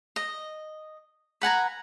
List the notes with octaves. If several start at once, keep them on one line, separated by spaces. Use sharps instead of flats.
D#5
B4 F#5 G#5 A#5